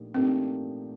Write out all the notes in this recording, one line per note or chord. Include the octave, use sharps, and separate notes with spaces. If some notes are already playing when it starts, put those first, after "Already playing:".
Already playing: A#1 A#2 A3 D#4 G4
A#1 A#2 A3 C4 D#4 G4